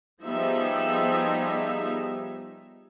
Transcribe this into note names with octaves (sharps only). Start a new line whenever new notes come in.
F3 G3 B3 D#4 G#4 E5